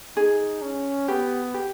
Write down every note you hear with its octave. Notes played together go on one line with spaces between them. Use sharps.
D#4 G#4
C#4
B3 G4
G4